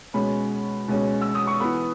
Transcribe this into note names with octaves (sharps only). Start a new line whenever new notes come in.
B2 G#3 C#4 B5
B2 G#3 C#4
E6
D#6
C#6
E3 B3 B5